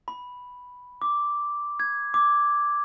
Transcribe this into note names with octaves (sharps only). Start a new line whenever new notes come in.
B5
D6
G#6
D6